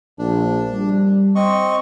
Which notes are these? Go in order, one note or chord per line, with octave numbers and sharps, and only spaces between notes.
A#1 D4
G3
C4 D#5 C#6